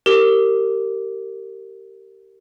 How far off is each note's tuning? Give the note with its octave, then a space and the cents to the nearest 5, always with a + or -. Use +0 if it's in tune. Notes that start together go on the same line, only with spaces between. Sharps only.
G4 -15 A#4 -25